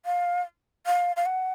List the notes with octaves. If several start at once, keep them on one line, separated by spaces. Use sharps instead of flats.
F5
F5
F5
F#5